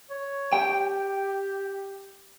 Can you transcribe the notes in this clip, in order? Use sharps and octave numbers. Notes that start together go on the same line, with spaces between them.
C#5
G4 G5